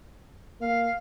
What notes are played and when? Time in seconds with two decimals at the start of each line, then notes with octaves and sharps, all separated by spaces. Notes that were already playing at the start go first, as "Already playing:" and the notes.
0.61 A#3 F5